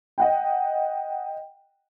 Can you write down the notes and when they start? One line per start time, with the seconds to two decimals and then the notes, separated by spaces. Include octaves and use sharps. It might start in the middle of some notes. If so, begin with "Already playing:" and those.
0.18 D#5 F#5 G5